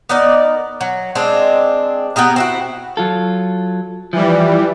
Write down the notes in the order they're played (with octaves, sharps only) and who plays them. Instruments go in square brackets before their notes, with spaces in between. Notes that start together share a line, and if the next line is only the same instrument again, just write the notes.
[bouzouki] B3 D#4 A#4 D5
F#3
G#3 C4 D4
B3 G4 G#4 A#4
C4 E4 F#4
[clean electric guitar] F#3 F4 A4
[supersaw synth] E3 G3 [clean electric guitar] F3